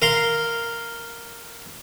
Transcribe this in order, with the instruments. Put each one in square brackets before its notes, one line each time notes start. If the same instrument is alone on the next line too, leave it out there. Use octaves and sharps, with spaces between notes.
[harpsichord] A#4 F5 C6